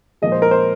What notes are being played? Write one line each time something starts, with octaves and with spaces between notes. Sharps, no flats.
A#2 F3 G#3 D#5
C5
A#4
C5